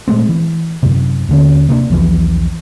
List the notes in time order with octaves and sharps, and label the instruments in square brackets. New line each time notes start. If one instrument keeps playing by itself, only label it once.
[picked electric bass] A#2 G#3 A3 C4
E3
F#2 C3
D#2 D3 C#4
C3 A#3 C4 D4
B1 E2 E3 F3